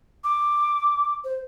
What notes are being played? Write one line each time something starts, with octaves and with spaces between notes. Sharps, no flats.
D6
C5